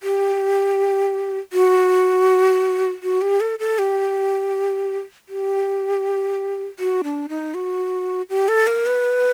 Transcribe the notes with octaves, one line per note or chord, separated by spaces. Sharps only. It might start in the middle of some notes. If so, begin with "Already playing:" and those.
G4
F#4
F#4
G4
A4
A4
G4
G4
F#4
D4
D#4
F#4
G4
A4
A#4
B4